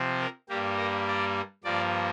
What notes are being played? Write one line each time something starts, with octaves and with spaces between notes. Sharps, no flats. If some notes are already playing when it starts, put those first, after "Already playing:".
Already playing: C3 F3 C4
A#4
G2 G3 A#3 G4
A#4
D5
G2 F3 A#3 D5